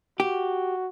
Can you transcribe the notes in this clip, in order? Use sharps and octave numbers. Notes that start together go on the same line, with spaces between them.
F#4 G4